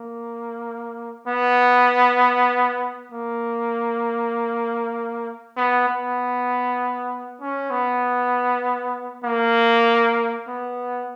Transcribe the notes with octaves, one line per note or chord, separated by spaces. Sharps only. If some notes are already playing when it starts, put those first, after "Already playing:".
Already playing: A#3
B3
A#3
B3
B3
C#4
B3
A#3
B3